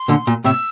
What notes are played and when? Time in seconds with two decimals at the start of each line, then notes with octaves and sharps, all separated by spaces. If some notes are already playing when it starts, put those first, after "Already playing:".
Already playing: C6
0.08 A#2 D3
0.27 A#2
0.44 A2 C3 E6